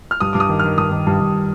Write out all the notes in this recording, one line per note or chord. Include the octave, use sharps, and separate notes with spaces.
F6
G2 D#6
G2 D6
D#6
D#3
D#3 F6
G2 D#6
D#3
G2
G2